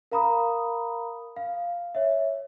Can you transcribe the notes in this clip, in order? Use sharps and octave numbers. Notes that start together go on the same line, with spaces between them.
A#4 F5 A#5 B5 D#6
F5
C#5 E5